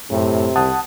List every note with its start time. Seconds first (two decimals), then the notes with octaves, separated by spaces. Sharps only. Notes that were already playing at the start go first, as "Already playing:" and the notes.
0.11 F#2 A2 C3
0.56 C2 F#5 A5 D#6